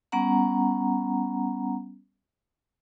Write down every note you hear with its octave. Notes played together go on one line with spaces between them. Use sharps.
G3 B3 C#4 F#5 A#5